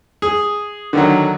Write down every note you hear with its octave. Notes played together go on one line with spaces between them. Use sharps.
G#4
D3 D#3 F#3